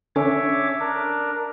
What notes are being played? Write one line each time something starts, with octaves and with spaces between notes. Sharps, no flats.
D3 C#4 C#5 E5 D6
D4 A#4